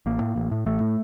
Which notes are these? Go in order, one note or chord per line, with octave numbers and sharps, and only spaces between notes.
A1 A#3
A2
A1
A2
A1 A3
A2